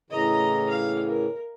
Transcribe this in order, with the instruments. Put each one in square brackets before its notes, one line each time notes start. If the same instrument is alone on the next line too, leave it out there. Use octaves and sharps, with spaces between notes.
[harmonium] A2 C#3 E3 [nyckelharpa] D#5 A#5
[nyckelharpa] F5
A#4